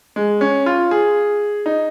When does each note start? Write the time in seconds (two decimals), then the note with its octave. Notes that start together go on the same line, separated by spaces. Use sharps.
0.16 G#3
0.41 C#4
0.66 F4
0.91 G#4
1.66 D#4